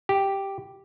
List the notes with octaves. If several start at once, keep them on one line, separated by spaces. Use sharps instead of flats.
G4